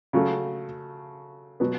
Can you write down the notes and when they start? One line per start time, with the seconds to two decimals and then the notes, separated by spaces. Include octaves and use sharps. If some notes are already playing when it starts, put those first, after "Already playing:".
0.13 C#3 F#3 A3
1.60 B2 F#3 B3